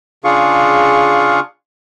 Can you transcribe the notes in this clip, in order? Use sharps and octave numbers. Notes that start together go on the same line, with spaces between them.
C#3 D4 F4 G#4 F5 C#6